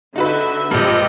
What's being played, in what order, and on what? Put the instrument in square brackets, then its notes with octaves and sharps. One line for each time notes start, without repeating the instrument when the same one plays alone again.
[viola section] D3 E5 [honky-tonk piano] D#4 F#4 B4
[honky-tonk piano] A#1 G2 [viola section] G#3 G4 D#5